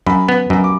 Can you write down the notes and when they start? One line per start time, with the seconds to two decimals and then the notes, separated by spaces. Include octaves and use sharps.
0.06 F#2 B5
0.28 B3
0.50 F#2
0.64 D6